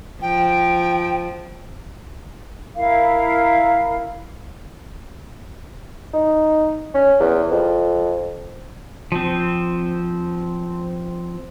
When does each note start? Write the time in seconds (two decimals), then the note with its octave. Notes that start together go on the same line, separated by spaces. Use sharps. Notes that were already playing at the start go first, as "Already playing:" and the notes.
0.22 F3 G5
2.76 E4 A#4 F5
6.13 D#4
6.94 C#4
7.20 E2
7.51 F2
9.12 F3 C4